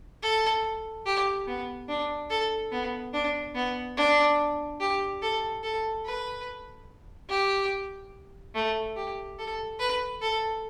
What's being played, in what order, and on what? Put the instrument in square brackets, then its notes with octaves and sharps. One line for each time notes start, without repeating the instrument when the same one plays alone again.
[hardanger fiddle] A4
G4
B3
D4
A4
B3
D4
B3
D4
G4
A4
A4
B4
G4
A3
G4
A4
B4
A4